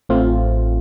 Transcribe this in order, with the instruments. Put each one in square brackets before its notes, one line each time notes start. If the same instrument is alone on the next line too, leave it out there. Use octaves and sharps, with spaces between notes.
[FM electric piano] A1 A2 A3 C4 F4